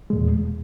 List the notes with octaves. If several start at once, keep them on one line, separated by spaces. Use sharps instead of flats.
E2 A#2 G#3